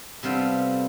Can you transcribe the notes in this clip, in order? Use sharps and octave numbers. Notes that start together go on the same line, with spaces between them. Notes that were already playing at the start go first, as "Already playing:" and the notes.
C3 G3 B3 A4 C5 F5